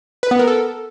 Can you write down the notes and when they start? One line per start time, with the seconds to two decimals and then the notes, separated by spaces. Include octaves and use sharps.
0.23 B4
0.31 B3
0.39 A#4
0.47 A4